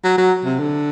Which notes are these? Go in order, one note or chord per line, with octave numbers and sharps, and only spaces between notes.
F#3
F#3
C3
D3